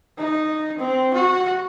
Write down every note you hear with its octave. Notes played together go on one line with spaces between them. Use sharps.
D#4
C4
F#4